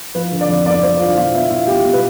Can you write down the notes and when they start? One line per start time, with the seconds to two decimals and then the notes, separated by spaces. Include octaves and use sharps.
0.15 F3 B4
0.32 D3
0.41 D5
0.49 F2
0.66 B3 D5
0.83 F3 C5
1.00 D3 F4
1.17 B2 F4
1.34 B3 E4
1.50 B2 F4
1.67 B3 G4
1.85 B2
1.93 B4